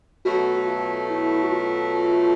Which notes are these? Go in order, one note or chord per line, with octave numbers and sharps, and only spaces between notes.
B2 F#3 A3 F#4
F#4
F4
E4
F#4
F4